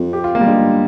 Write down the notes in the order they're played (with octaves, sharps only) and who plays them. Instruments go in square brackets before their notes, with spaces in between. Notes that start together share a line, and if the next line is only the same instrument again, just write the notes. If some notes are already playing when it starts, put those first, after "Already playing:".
Already playing: [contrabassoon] F2
[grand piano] G4
F4
A#3
G3
[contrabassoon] G2 [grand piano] G#3